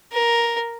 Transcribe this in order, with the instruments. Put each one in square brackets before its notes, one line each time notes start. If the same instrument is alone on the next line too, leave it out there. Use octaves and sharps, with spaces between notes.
[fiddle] A#4